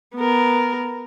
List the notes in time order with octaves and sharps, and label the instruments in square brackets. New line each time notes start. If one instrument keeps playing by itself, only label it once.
[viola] B3 A#4